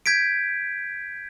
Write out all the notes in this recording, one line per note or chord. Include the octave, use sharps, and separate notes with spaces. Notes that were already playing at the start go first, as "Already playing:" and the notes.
G6 G#6 B6 D7